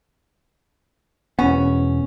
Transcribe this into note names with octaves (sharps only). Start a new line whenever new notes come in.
E1 B3 C#4